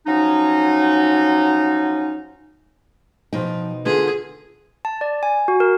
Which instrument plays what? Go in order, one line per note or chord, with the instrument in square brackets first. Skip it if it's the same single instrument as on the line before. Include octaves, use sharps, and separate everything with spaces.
[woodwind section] F3 F#3 C#4 D#4
[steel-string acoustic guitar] B2 D#4 [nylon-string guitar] F3 G5
[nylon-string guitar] D3 B3 F4 [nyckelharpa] G#4
[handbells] A5
D5
G#5
F#4
A#4